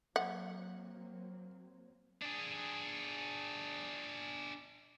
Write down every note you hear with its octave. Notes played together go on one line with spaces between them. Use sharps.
F#3 A#3 C4 F#5
D4 G#4